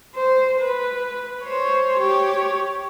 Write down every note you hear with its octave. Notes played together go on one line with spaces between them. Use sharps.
C5
B4
C5 C#5
G4 C#5